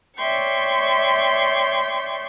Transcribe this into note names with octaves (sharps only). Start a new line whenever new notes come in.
C#5 D5 E5 G5 C6 C#6